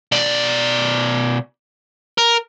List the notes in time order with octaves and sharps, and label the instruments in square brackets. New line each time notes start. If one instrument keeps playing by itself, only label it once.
[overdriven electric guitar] B2 D5
A#4